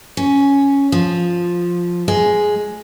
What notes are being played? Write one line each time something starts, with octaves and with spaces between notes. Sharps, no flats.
C#4
F3
G#3